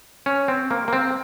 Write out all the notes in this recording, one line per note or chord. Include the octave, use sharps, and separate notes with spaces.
C#4
C4
A#3
A#3
C4